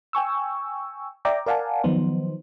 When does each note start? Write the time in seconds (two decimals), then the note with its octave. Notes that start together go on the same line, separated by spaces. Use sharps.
0.13 G5 G#5 C#6 E6
1.25 D5 E5 G5 A#5 D6
1.46 A#4 D5 F5 F#5 G#5 A5
1.84 D#3 F3 F#3 B3 D#4 C5